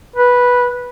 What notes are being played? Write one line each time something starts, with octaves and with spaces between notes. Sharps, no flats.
B4